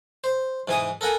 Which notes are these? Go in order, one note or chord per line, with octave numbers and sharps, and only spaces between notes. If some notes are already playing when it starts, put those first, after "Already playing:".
C5
G#2 E3 G#5 D#6
A4 A#4 F#5 G#5